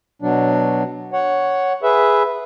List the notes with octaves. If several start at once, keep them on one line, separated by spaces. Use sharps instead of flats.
B2 F#3 D4
C#5 F#5
G#4 B4 E5